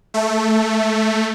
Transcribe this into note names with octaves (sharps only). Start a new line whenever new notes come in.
A3